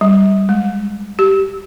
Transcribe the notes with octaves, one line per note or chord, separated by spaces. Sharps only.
G3
G#3
G4